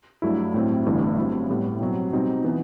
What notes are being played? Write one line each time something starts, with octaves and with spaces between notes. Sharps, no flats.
G2 F#3 A3 E4
A2 F#3 C4 E4
G1 G2 E3 A3 E4
G2 F#3 C4 E4
A2 G3 B3
B2 F#3 C4
B2 G3 C4 D#4
E3 B3